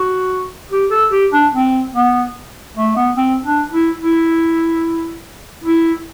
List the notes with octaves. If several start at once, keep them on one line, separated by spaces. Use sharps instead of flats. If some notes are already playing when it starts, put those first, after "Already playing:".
Already playing: F#4
G4
A4
G4
D4
C4
B3
A3
B3
C4
D4
E4
E4
E4